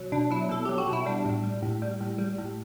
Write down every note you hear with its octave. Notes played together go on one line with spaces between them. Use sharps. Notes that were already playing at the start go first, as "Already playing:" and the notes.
Already playing: B2 F#3
B2 D4
F#3 E4
B2 A4
F#3 G4
F#4
B2
E4
G3 D4
A2
G3
A2
G3
A2
G3
A2